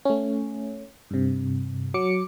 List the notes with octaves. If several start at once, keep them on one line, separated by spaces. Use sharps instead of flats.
A3 C#4
G2 C3
F#3 D6 C#7